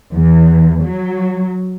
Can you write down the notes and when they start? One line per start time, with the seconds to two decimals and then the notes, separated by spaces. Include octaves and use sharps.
0.13 E2
0.83 F#3